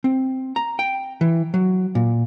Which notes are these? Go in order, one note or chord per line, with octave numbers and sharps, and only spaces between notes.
C4
A#5
G5
E3
F#3
A#2